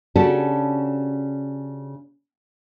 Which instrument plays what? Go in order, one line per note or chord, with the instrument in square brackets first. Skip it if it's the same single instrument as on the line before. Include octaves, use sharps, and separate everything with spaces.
[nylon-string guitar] C#3 C#4 D4 F#4 G4 A4